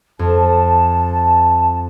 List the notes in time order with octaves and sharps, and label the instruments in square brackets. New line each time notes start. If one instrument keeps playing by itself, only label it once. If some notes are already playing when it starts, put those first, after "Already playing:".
[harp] F2 [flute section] A5